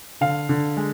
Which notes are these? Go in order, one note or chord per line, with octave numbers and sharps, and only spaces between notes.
D3 F5
D3
G#3